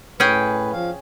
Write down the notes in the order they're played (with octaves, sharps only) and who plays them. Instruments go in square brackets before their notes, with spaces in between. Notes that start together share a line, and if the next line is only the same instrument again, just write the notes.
[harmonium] A2 B4 [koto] C#4 G#4 G5
[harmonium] F3 F5